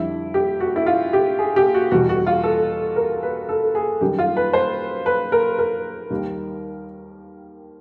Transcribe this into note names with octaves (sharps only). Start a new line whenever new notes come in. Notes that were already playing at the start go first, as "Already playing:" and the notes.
Already playing: F2 D3 G3 E4
G4
F#4
E4
F4
G4
G#4
G4
F#4
E2 B2 G3 F#4
F#4
F4
A4
A#4
B4
A4
G#4
F#2 D#3 G3 G4
F4
B4
C5
B4
A#4
A#4
D#2 D#3 G3